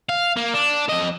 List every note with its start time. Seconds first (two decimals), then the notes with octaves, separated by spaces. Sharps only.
0.09 F5
0.36 A#3
0.54 D4
0.89 F2 D#5